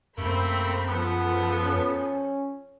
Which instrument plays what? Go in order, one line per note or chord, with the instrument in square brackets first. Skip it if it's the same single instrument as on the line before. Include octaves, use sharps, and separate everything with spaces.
[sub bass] F#2 [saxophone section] C3 A3 A#3 [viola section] C4 B5
[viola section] F3 A4 [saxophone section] B3
[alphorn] C#4